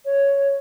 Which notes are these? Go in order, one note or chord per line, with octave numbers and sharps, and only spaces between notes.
C#5